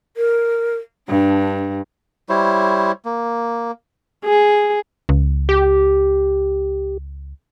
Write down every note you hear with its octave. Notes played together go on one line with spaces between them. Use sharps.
A#4
G2 D4
G3 E4 C5 C#5
A#3
G#4
C#2
G4